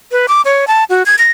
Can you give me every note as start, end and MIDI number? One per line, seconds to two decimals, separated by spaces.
0.12 0.26 71
0.28 0.41 86
0.45 0.67 73
0.67 0.84 81
0.90 1.03 66
1.06 1.15 92
1.18 1.31 94